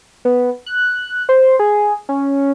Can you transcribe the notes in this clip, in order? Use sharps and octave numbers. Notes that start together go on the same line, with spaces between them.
B3
F#6
C5
G#4
C#4